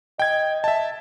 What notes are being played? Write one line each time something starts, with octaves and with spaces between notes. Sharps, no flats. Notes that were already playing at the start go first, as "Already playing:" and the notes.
D#5 G5 G#6
E5 A5